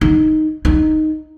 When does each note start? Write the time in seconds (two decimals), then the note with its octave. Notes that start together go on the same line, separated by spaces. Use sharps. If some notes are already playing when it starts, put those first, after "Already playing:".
0.01 D#4
0.65 D#4